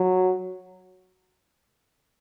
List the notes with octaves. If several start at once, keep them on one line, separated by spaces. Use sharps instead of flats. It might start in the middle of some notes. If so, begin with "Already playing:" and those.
Already playing: F#3